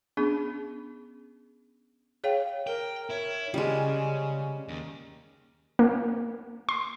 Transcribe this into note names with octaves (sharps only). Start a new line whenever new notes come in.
B3 C#4 D4 G#4
G#4 C#5 F5 G5
A#4 G5
E4 C#5
C#3 G3 G#3 C#4
D#2
A#3
C6